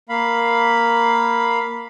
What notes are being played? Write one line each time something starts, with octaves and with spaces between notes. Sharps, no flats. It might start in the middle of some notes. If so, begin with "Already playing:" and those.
A#3 F5 B5